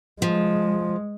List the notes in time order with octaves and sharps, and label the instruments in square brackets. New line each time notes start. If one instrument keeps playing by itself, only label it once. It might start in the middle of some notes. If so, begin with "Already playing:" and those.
[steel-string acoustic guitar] F3 [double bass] G#3